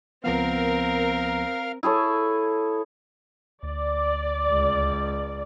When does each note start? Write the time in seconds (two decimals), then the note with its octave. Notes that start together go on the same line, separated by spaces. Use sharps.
0.24 C#2 F3 B3 C4 A#4 F5 F6
1.83 E4 G#4 A4 C#5
3.63 D2 D5
4.50 C#2